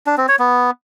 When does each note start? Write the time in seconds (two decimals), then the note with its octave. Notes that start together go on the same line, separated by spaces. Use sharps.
0.07 D4
0.17 C4
0.28 C#5
0.39 B3